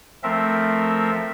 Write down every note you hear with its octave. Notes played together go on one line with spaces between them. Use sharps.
F3 A3 C4 A#4 E5